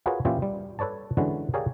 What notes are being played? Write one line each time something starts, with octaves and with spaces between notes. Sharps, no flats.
F4 F#4 G#4 A#4 B4 C#5
A#2 E3 C#4 E4 F4 G4
G3
A4 B4 C#5 D5 A5
D3 E3 G#3 C#4 F#4 B4
G4 G#4 A#4 C#5 D5 F5